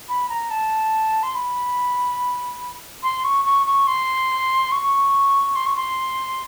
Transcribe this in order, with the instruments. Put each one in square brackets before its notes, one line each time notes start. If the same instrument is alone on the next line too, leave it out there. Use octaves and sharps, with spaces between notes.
[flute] B5
A#5
A5
C6
B5
C6
C#6
C#6
C#6
C6
C#6
C6
C#6
C6